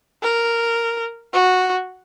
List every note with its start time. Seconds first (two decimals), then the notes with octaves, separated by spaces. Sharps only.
0.23 A#4
1.33 F#4